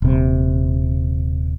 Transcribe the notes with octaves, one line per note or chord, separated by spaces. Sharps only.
D#1 C3